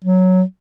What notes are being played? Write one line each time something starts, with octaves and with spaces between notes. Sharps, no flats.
F#3